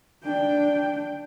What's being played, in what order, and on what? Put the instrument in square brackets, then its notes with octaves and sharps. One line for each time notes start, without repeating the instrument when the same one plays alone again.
[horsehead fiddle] D4 G5